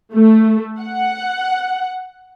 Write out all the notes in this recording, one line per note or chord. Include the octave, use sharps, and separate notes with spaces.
A3
F#5